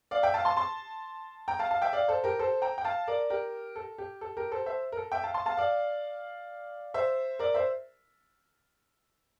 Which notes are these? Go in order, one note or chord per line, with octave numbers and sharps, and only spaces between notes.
D5 F5
E5 G5
F5 A5
A5 C6
A5 C6
G5 A#5
F5 A5
F5 A5
E5 G5
D5 F5
A4 C5
G4 A#4
A4 C5
G5 A#5
G5
F5 A5
A#4 D5
G4 A#4
A4
G4
A4
G4 A#4
A4 C5
C5 E5
A#4
A4
E5 G5
F5 A5
A5 C6
F5 A5
D5 F5
C5 E5
A#4 D5
C5 E5